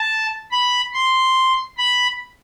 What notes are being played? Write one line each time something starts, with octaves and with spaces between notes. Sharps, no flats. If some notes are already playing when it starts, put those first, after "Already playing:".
Already playing: A5
B5
C6
B5